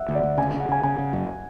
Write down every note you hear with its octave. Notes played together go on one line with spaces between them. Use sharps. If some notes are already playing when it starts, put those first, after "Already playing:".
Already playing: E5 F#5
D2
D5
D2
C#3 G#5
C#3
F#5
C#3 G#5
C#3 G#5
C#3
F#2